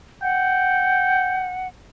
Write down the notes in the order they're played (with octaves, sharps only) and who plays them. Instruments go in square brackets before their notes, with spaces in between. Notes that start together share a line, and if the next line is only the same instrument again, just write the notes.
[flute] F#5 [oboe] G5